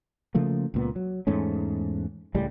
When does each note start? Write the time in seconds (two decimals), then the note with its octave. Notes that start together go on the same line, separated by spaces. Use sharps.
0.35 C#3 F3 A3 A#3
0.74 C#2 A#2 B3
0.96 F#3
1.27 E2 G#2 A3 C#4
2.35 C#2 A2 G3 G#3